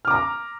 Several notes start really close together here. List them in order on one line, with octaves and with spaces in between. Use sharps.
F6 D6 A#5